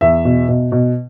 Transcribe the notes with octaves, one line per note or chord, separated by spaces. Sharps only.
E2 E5
B2
B2
B2